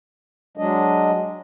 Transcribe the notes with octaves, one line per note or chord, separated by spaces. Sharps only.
F#3 G#3 D4 D#5